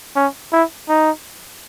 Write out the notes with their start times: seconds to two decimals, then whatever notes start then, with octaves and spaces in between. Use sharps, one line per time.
0.16 C#4
0.53 E4
0.89 D#4